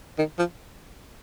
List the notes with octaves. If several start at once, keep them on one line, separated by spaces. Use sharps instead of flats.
D#3
F3